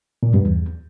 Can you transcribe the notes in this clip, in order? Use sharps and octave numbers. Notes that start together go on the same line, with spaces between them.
A#2
G2
E2